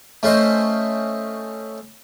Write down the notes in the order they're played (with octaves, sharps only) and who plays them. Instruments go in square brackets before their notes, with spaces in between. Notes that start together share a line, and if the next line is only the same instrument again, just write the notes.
[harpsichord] A3 C#4 C5 D#5